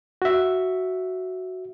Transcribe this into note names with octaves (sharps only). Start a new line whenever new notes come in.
F#4 E5